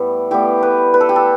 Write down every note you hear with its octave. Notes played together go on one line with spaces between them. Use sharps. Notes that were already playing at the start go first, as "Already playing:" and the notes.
Already playing: A2 G3 B3
A2 G3 B3 G4
B4
B4
A4
G4
A4